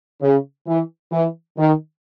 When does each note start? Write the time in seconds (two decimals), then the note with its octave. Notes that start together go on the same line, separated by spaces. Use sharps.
0.22 C#3
0.67 E3
1.12 E3
1.58 D#3